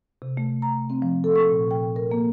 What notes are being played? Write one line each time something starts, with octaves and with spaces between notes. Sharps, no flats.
C3
A3
A#5
C4
F3
A4
C#6
A#2
G5
A#4
A#3